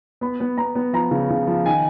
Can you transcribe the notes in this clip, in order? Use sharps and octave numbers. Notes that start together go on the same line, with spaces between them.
B3 B5
B3
B3 A#5
B3
F3 A#5
C#3
C#3
F3
D#3 G#5